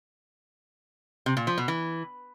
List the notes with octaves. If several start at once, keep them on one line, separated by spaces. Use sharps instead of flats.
C3
A#2
F3
B2
E3